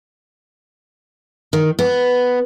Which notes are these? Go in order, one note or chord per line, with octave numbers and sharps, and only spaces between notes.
D#3
B3